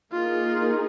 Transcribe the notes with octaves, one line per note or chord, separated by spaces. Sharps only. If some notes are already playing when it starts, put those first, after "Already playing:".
A#3 D#4 F4 G#4